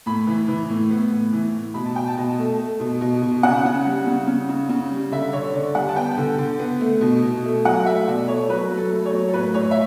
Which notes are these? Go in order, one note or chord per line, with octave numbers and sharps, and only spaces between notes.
A2 B5
E3
E3
A2
B3
A2
E3
A2
B2 B5
A5
B2 G5
A5
B2
A3
A3
B2
B2
B2
C#3 F#5
C#3
G3
C#3
C#3
C#3
C#3
G3
D3 E5
D3 C#5
D3 D5
G3 F#5
A5
B3 G5
D3
D3
B3
A3
B2
B2
A3
F#3 F#5
A3 E5
B2 D5
A3 C#5
F#3 B4
F#3
A4
A3
C#5
F#3
A4
A2 B4
A2 C#5
E5